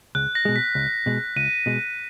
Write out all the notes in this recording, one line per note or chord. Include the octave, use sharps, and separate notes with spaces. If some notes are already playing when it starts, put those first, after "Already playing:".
C#2 F#6
A#6
B2 G#3
B6
C#2
B2 G#3
C#2 D#7
B2 G#3